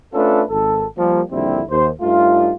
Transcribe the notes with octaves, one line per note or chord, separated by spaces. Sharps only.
A3 C#4 D4 F4 A4 B4
G#1 A4
F3 G3 A#3
A#1 D#2 D3 G3 C4 E4
D#2 C5
G2 A3 D#4 F4